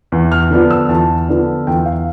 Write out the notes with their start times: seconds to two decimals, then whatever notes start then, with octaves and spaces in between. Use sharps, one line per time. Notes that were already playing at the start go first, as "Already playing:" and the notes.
0.12 E2
0.32 F6
0.51 D3 F3 B3 D4
0.71 E6
0.89 E2 A5
1.29 D3 F3 B3 D4
1.67 E2 G5
1.86 F5